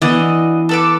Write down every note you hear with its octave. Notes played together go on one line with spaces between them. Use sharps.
E3 B3 D4 F#4 D#5
A4 B4 D6